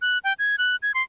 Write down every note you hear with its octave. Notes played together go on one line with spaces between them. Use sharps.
F#6
G5
G#6
F#6
G#6
C6